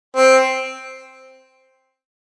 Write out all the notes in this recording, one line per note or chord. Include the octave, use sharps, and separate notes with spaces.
C4